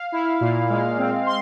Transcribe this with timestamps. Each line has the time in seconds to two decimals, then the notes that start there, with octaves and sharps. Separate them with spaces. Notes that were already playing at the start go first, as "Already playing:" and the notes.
Already playing: F5
0.12 E4
0.41 A#2
0.70 G#3
0.98 C4
1.26 C6